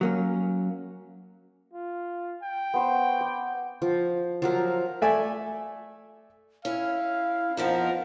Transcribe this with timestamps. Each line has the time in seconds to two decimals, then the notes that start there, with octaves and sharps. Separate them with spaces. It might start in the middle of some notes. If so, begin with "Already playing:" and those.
0.01 F#3 A#3 C#4
1.73 F4
2.42 G5
2.74 B3 C5 C#6
3.21 D6
3.82 F3
4.42 F3 F#3 A#4
5.02 A3 A4 D5 E5 G#5
6.65 C#4 E4 F5
7.57 F2 F3 B3 D#4 F4 A#4 C5